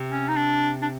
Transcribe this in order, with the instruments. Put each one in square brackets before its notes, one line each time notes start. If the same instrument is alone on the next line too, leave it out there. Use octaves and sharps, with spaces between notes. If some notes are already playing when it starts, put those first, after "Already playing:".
Already playing: [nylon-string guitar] C3
[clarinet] C#4
D#4
D4
D4